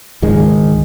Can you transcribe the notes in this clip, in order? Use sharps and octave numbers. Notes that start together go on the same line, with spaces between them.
C#2 G#2 D#3 G#3